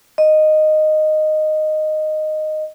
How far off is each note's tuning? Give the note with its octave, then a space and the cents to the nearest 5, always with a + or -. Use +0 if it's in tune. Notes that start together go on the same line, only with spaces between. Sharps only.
D#5 -10